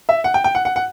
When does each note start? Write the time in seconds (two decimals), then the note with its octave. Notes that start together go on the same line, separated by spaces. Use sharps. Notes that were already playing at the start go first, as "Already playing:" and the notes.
0.09 E5
0.24 F#5
0.34 G5
0.44 G5
0.55 F#5
0.65 F#5
0.76 F#5